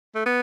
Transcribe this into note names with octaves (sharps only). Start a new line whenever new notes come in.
A3
B3